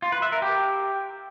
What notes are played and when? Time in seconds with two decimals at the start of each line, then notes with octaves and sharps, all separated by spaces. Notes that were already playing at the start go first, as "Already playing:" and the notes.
0.02 F4
0.12 B4
0.22 E5
0.32 A#4
0.42 G4